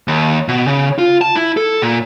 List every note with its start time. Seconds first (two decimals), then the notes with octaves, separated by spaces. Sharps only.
0.08 D#2
0.48 B2
0.67 C#3
0.99 F4
1.21 A5
1.36 E4
1.57 A4
1.82 A#2